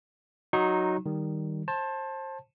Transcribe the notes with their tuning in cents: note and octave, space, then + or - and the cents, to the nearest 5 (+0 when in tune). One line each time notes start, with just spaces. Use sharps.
F#3 +0 D#4 +0 C#6 -35
D#3 +0 G3 +0
C5 +30 A5 +0